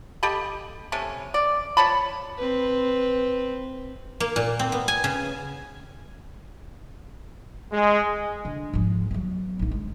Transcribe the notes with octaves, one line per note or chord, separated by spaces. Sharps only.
G4 A4 D#5 B5
C3 A3 C#4
D5
F3 C#5 A5 B5
C4 B4
A#3
A#2
C4
B3
G#5
C#3
G#3
D3
G#2 F3
F#3 B3
A1 D#4
G#3